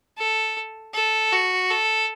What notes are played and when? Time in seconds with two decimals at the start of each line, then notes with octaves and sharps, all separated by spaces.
0.18 A4
0.94 A4
1.32 F#4
1.70 A4